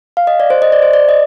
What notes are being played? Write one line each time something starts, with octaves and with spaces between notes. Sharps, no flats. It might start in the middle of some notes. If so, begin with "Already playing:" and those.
F5
D#5
D5
C5
D#5
D5
C5
D5
D#5